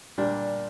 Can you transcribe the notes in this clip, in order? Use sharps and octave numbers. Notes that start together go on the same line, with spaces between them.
A#2 G3 D4